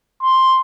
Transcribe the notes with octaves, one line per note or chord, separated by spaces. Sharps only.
C6